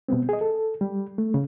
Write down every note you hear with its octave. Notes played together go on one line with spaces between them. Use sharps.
B2 G3 B3 C4
G#4 D#5
A4
G3
A3
C#3